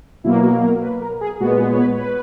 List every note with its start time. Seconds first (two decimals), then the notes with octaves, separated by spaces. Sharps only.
0.24 B2 F#3 A#3 E4
0.43 F#4
0.63 A#4
0.82 B4
1.02 A#4
1.21 G#4
1.40 A#2 G#3 B3 F#4
1.60 G#4
1.73 C#5
1.79 B4
1.93 C#5
1.99 B4